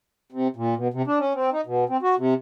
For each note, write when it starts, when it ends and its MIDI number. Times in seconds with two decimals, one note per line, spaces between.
0.32 0.48 48
0.56 0.74 46
0.76 0.88 47
0.94 1.02 48
1.07 1.19 62
1.19 1.33 61
1.35 1.50 60
1.53 1.61 63
1.66 1.84 47
1.89 1.97 60
2.02 2.15 66
2.18 2.34 48